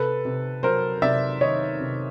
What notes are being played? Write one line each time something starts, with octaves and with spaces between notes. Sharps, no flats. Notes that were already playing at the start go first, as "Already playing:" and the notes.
Already playing: C3 A4 B4
C3
F#3 A#4 C5
C3 D5 E5
D#3 C#5 D#5
C3